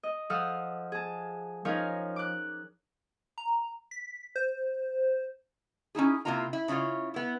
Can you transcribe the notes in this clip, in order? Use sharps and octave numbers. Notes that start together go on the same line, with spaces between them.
D#5
F3 A4 F5 F#5 D#6 F6
G#4 A5
F3 C#4 D#4 A#4 C#5 F5
D6 F#6
A#5
B6
C5
C#4 D#4 E4 G#4
C3 E3 A#3 E4 F4 A#5
E4
C#3 C#4 E4 F4 C#5
B3 E4